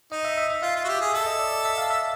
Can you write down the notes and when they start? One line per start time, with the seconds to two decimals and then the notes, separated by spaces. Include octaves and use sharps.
0.12 D#4 D#5
0.25 E5
0.38 E5
0.50 E5
0.62 F4 F5
0.76 F4
0.84 F#4
0.88 G4 E5
1.01 G#4
1.14 A4 E5
1.27 D#5
1.39 D5
1.65 E5
1.78 F5
1.90 E5